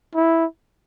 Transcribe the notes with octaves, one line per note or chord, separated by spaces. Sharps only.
E4